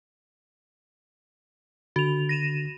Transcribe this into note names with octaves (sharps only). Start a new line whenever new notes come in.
D3 F#4 F7
A#6 D#7 E7